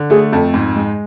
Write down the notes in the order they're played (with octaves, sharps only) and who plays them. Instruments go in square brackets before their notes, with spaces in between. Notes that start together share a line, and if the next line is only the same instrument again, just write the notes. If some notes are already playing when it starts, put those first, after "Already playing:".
Already playing: [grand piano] D3
[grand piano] A3 [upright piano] G#4
[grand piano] F2 [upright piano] A4
[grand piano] G#2
G#3